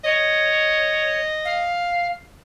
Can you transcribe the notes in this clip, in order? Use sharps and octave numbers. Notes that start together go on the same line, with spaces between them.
C#5 D#5
F5